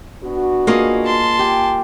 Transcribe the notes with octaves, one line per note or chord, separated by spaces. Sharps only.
B3 D4 F#4
A#3 F4 G#4 C#5 D#5
A5 C6
G4 G5 G#5